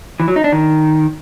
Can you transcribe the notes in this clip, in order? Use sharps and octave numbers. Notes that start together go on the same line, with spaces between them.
E3
F#3
D#4
D4
D#3